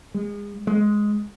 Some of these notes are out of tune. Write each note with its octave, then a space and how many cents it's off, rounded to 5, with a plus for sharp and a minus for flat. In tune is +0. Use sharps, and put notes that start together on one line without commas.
G#3 -30
G#3 +5